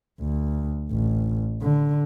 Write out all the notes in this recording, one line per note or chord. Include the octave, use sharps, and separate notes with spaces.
D2
A1
D3